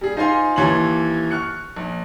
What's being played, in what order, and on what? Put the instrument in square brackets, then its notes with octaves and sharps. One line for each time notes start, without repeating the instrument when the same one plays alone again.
[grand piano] G3 G#4
D#4 F4 C5 F5 G#5 C6
D#2 E3 C#5 A#5 C6 F#7
C#6 F6 F#6 C#7
A#1